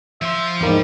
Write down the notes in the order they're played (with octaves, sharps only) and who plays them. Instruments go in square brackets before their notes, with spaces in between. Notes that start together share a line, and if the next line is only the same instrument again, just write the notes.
[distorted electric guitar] F3 C6 [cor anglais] E5
[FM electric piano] E2 A#3 [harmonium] G#2 [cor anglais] G3